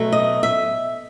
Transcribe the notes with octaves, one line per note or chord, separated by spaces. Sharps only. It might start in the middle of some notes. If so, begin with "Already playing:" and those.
Already playing: B2 F#3 A3
D#5
E5